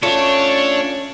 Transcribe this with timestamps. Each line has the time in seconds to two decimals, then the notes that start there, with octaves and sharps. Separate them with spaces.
0.03 A3 C#4 D4 F4 C#5